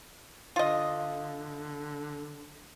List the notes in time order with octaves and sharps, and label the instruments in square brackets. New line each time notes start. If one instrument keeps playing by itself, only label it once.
[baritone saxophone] D3 [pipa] F4 D#5